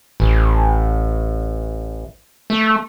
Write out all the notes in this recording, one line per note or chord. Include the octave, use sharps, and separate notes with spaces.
A1
A3